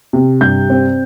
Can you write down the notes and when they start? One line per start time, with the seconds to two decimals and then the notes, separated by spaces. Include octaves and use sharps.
0.13 C3
0.41 G2 G6
0.70 C4